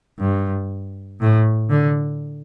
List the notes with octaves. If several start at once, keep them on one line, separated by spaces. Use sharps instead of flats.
G2
A2
D3